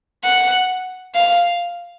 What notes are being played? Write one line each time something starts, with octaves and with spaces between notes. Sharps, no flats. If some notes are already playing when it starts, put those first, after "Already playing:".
F#5
F5